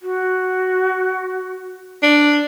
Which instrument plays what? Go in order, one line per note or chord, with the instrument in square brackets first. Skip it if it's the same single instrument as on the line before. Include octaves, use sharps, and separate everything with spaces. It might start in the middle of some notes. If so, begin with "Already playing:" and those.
[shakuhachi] F#4
[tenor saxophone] D4